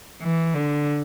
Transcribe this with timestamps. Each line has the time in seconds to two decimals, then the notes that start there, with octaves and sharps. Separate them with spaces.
0.21 E3
0.54 D3